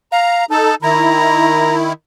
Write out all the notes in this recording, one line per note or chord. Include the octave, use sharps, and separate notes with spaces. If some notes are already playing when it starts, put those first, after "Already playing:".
F5 A#5
D#4 A4 A5
D#3 E4 A#5